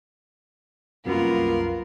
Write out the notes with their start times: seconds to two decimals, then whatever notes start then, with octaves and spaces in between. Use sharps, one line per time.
1.06 C2 F#2 A#3 B3 F4 A#4